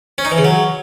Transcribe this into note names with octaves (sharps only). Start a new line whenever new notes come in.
C#4
D#4
E3
C#3
F#3